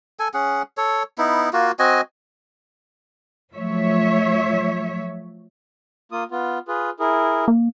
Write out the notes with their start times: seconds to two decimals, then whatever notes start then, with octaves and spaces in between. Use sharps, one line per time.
0.19 A4 G#5
0.34 C#4 G#4 F#5
0.77 A4 C#5
1.18 B3 D#4 E4
1.53 A#3 F4 F#4
1.79 C4 F#4 D#5 G#5
3.53 F3 F#3 A3 C#5 E5
6.12 A#3 F4 D#6
6.31 B3 F4
6.68 F4 G#4 B4
7.00 E4 G#4 A#4
7.48 A#3